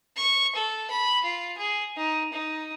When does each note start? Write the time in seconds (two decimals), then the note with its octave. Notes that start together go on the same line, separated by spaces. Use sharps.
0.17 C#6
0.55 A4
0.91 B5
1.24 F4
1.58 G#4
1.97 D#4
2.33 D#4